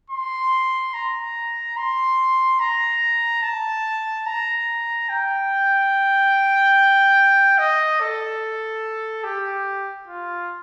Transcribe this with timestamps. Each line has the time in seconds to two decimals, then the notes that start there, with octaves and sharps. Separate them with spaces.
0.10 C6
0.94 A#5
1.77 C6
2.60 A#5
3.42 A5
4.26 A#5
5.09 G5
7.58 D#5
8.00 A4
9.24 G4
10.08 F4